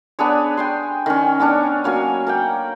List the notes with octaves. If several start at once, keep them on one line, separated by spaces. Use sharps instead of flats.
B3 D4 G#4 C#5
G5 G#5 C6
D#3 C#4
B3 C#4 D4 C#5
F#3 A#3 C#5 G#5
A#4 F#5 G5